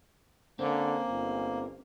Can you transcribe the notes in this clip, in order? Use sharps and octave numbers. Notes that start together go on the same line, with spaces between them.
D3 A#3 C4 C#4
G1